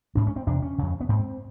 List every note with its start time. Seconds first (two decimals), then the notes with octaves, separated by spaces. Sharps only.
0.15 G#2 D4
0.27 C#4
0.36 C4
0.47 E2 C3 D4
0.62 C#4
0.78 F2 C#3
1.01 B3
1.09 G#2 C4